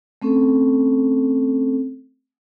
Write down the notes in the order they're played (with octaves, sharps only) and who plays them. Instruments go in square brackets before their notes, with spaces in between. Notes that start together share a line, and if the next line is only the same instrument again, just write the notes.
[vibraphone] A3 C4 C#4 A4